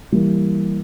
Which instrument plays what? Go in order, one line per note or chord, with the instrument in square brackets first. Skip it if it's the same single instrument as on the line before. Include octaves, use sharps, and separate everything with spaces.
[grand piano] E3 G3 A#3